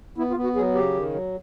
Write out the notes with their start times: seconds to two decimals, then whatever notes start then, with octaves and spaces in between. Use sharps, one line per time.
0.18 B3 E4
0.31 F4
0.37 B3
0.44 F#4
0.56 F#3 G#4
0.75 C#3 G4
0.94 D#3
1.13 F#3